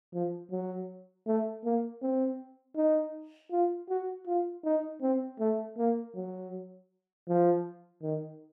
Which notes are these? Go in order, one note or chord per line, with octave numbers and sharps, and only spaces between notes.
F3
F#3
A3
A#3
C4
D#4
F4
F#4
F4
D#4
C4
A3
A#3
F#3
F3
D#3